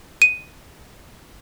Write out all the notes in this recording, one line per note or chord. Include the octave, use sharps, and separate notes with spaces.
D#7